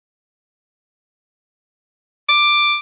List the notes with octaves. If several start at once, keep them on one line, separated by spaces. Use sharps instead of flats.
D6